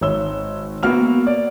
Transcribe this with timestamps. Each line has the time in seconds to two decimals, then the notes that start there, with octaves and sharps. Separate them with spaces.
0.01 G#1 C#5 E6 G7
0.83 A#3 B3 F#4 F6 F7
1.27 D5